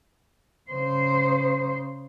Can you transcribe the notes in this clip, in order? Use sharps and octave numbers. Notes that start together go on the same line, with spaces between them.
C#3 C5